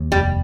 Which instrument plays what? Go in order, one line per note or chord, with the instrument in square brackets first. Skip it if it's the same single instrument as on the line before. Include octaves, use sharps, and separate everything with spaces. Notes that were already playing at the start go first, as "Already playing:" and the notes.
Already playing: [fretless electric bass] D#2
[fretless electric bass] F1 [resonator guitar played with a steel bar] G3